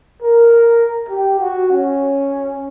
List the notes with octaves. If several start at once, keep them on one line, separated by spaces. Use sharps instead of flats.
A#4
G4
F#4
C#4